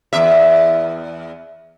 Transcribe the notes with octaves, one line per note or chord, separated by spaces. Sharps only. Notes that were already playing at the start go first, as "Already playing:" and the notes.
E2 E5